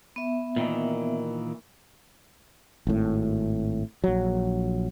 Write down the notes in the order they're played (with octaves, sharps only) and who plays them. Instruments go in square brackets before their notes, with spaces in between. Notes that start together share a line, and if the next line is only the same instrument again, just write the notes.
[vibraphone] B3 E5
[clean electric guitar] A#2 D#3 E3
[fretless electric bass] G#1 A2
A#1 F#3